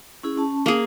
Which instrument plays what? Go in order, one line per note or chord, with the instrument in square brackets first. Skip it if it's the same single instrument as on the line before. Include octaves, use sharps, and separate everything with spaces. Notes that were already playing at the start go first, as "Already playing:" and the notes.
[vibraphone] C#4 E4 G#4
C#4 A5
[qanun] A#3 G#4